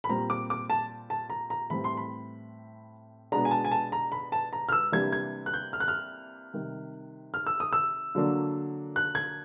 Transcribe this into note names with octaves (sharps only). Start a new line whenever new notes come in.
B5
A#2 G3 C4 A#5
D6
D6
A5
A5
A#5
A#5
A2 E3 G3 C4 B5
C6
B5
B2 G#3 B3 D4 A#5
G#5
A5
G#5
A5
A#5
B5
A5
A#5
F6
E6
C3 E3 G3 A#3 D4 G#6
G#6
F#6
G6
F6
F#6
F6
C3 D#3 G3
F6
E6
D#6
E6
D3 F#3 A#3 D4
F#6
G#6